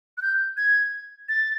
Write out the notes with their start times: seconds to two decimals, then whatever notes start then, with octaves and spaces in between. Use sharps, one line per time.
0.17 F#6
0.22 G6
0.57 G#6
1.29 A6